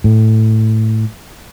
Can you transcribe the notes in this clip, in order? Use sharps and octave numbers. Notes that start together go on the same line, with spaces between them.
A2